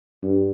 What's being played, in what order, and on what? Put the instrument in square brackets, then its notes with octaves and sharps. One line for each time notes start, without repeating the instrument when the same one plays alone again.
[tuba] G2